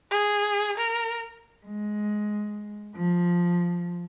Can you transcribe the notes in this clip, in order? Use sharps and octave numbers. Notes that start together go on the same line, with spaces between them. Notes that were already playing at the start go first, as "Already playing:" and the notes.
G#4
A#4
G#3
F3